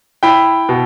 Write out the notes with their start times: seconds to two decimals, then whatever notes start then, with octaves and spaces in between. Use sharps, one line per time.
0.23 E4 G5 B5
0.69 B2